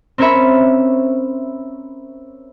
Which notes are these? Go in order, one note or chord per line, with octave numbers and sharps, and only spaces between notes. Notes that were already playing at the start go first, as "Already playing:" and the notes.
C4 C#4 A#4 C#5 E5 B5